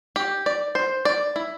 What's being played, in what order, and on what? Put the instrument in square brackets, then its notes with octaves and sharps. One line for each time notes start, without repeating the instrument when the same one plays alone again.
[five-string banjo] G4
D5
C5
D5
E4